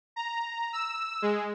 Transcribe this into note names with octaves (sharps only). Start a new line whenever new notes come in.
A#5
E6
G#3